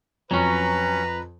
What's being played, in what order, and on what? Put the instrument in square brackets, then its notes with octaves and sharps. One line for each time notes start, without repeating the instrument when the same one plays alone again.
[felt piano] F2 [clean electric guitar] F#3 C#4 [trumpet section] B4 A#5